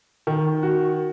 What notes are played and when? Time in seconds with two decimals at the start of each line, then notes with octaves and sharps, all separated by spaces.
0.27 D#3
0.63 F#4